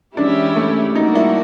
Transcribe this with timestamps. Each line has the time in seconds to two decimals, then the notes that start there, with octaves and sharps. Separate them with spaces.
0.16 E3 G#3 C#4 D4 E4 G4
0.56 A3
0.95 G3 A#3 D4 D#4 F#4 A#4
1.15 E4